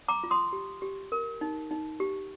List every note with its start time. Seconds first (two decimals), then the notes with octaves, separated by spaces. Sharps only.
0.08 A#5 D6
0.23 F4
0.31 C6 D#6
0.53 G4
0.82 G4
1.12 A#4
1.41 D#4
1.71 D#4
2.00 G4